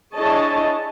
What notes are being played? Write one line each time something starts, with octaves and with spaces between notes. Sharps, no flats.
D4 E4 G#4 C#5 D#5 A5